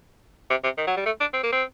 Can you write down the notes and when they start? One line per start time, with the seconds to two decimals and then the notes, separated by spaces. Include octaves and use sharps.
0.50 C3
0.64 C3
0.78 D#3
0.87 F#3
0.96 G3
1.06 A3
1.20 D4
1.34 C4
1.43 A#3
1.52 C4